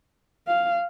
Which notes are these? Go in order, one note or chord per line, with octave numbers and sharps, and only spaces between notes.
F5